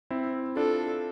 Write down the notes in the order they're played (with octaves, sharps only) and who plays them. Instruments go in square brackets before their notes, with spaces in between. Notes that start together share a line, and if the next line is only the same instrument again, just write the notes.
[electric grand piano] C4 E4
[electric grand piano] D4 F4 [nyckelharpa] A4